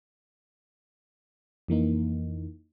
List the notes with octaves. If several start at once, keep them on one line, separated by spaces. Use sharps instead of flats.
F2 E3 A#3 D#4